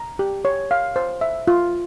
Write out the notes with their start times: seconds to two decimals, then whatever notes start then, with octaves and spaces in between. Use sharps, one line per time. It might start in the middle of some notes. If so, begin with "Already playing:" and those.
Already playing: A#5
0.19 G4
0.45 C#5
0.71 F5
0.96 C5
1.21 E5
1.47 F4